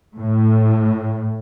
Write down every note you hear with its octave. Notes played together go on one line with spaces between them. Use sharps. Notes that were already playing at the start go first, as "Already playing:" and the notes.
A2